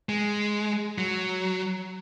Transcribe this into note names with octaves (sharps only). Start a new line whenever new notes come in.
G#3
F#3